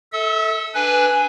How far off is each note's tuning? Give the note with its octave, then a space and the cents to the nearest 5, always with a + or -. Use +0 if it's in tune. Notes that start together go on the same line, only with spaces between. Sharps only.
A4 +0 E5 -30 E6 -40
D4 +0 B4 +0 G#5 +0